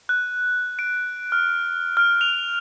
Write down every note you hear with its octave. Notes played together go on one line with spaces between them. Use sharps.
F#6
D7
F6
F6
F7